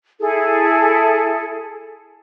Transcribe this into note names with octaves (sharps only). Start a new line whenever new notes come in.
E4 G#4 A4